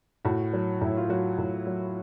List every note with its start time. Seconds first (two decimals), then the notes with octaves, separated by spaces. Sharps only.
0.25 A2 F#4
0.53 F#3
0.81 A2 E4
0.97 F4
1.09 F#3 F#4
1.38 A2
1.67 F#3